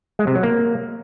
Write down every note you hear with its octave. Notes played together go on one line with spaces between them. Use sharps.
G#3
C3
F#3
A#3